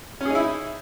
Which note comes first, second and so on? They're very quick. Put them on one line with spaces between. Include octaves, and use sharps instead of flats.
C#4 G#4 D#4 E4